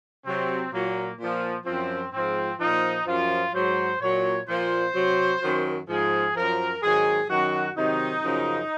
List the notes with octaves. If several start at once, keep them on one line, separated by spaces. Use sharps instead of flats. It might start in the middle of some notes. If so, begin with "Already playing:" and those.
C3 F#3 C4
A#2 F#3 A#3
A#2 F3
F#2 F3 C4
G#2 F3 C4
A#2 F3 D#4
F#2 F3 F4
G#2 F#3 C5
A#2 F#3 C#5
A#2 F3 C5
C3 F#3
F#2 D#3 F#3
G#2 F3 G#4
F#2 F3 A#4
G#2 D#3 F#3 G#4
F#2 D#3 F#3 F#4
C3 D#3 F#3 D#4
F#2 C#3 F3